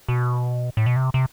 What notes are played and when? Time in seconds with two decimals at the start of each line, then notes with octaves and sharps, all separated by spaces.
0.08 B2
0.77 A2
0.86 B2
0.96 C3
1.14 C3